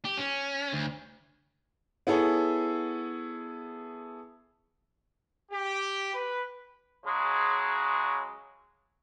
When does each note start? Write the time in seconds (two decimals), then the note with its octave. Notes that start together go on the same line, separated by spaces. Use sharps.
0.05 G4
0.18 C#4
0.73 D2
2.07 B3 E4 G#4 A4 C#5
5.51 G4
6.14 B4
7.05 C#3 F#3 G#3